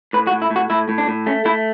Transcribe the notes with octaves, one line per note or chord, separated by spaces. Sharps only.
A2 B4
F#4
A2
E4
A2
F#4
A2 E4
A2
D4
A2
A3 C#4
A3 E4